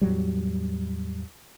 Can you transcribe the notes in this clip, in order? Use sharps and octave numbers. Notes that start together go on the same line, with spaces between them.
E2 A2 F#3 G3